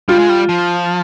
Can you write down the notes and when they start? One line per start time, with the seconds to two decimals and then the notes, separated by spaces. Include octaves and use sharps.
0.08 G3 F4
0.19 G#3
0.29 G3
0.49 F3